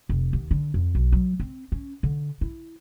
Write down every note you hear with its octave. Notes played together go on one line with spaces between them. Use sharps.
F1
D#2
D3
F2
B1
F#3
C4
C#4
D3
E4